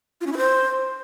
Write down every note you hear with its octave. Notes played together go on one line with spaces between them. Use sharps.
F4
C#4
E4
C5